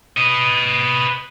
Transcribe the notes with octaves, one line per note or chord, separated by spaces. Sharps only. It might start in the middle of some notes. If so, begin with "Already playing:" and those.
B4 D#5